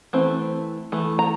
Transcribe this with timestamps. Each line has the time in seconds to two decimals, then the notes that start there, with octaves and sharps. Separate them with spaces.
0.13 E3 A3 C4
0.92 E3 A3
1.19 A#5